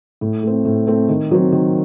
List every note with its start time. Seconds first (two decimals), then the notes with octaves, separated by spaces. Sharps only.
0.21 A2
0.43 A3 C4
0.65 A2
0.87 A3 C4
1.09 D#3
1.31 F#3 C4
1.52 D#3